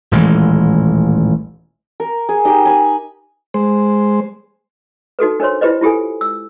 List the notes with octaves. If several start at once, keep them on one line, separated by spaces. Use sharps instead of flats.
D#1 A1 E3 G#3
A#4
G#4
D#4 G4 G5
G#5 B5
G#3 C5
D#4 F#4 A4 B4
D4 A#4 C5 C#5 C6
E4 F4 G4 B4 C5 D#5
E4 F4 G4 A4 G#5
E6